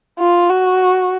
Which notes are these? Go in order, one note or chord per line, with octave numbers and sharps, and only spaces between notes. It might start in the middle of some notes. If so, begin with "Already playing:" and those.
F4
F#4